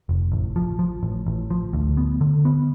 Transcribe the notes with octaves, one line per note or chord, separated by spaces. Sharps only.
F1
A1
F3
F3
A1
A1
F3
D2
B3
D3
B3